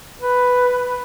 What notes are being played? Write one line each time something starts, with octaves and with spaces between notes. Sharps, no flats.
B4